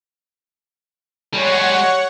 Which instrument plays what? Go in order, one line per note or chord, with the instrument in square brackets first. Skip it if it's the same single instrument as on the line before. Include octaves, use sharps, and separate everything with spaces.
[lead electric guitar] G3 G#3 [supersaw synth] C#5 F#5 C#6